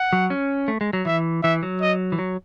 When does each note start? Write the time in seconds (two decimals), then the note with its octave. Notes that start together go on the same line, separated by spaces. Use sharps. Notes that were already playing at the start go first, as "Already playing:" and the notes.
Already playing: F#5
0.13 F#3
0.30 C#4
0.68 A3
0.81 G#3
0.93 F#3
1.05 E3 E5
1.43 E3 E5
1.63 F#3
1.81 D#5
2.12 E3
2.19 F#3